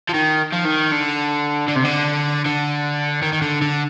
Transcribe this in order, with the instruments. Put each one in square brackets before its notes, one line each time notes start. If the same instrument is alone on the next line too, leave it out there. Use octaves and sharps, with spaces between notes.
[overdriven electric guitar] F3
D#3
F3
D#3
D3
D3
C3
D3
D3
D#3
D#3
D3
D3